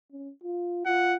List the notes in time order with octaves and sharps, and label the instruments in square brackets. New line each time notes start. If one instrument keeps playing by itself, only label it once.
[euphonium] C#4
F4
[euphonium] F4 [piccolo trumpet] F#5